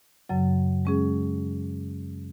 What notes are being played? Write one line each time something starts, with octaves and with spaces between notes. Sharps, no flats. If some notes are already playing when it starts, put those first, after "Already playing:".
F#2 C#3 F#3
G#3 C#4 G#4